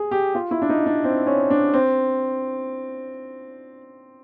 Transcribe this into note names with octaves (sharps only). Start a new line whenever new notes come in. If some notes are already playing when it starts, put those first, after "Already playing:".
Already playing: G#4
G4
F4
E4
D4
D#4
D4
C4
C#4
D4
C4